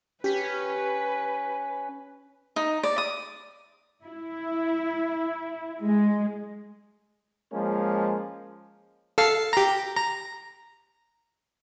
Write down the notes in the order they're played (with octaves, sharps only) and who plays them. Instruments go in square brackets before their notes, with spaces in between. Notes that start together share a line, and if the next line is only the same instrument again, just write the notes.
[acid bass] C#4 [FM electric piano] G4 B6 [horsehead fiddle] B4
[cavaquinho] D#4
D5
D#6
[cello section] E4
G#3
[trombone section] F3 G#3 A#3 C#4
[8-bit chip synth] A4 F5 C7
G4 A#5
A#5